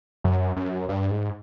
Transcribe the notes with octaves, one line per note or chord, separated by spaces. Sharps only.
F#2
F#2
G2
G#2